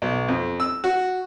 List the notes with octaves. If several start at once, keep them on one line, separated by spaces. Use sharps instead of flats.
B1
F2
E6
F#4